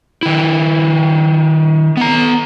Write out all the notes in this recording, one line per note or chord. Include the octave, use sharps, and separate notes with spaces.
D#3 E4
B3 A#5